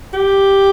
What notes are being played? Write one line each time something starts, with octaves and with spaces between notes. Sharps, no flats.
G4